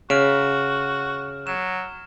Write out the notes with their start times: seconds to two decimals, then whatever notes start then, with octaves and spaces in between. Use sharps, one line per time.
0.10 C#3 F#4 F6 D7 E7
1.47 F#3 E7